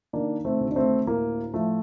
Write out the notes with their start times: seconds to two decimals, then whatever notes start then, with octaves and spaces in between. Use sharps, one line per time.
0.13 D#3 A#3 D4
0.45 A3 C4
0.60 D2
0.71 D4
0.76 A3 C4
1.07 A2 A#3
1.54 F3 A3